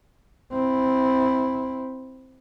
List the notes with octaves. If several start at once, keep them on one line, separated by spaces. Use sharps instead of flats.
C4 E4